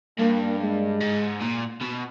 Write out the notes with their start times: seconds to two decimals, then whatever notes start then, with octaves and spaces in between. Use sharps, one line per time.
0.19 G2 A#3
0.60 G#3
1.01 G#2
1.42 A#2
1.82 B2